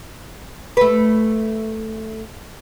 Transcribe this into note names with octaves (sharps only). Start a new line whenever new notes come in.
A3 B4